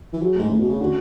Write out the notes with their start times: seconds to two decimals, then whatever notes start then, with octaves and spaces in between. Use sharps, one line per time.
0.13 E3
0.21 F#3 G#4
0.36 G#2 A3
0.49 A2 E3
0.59 B2
0.65 C#3 C#4
0.80 D3 F#4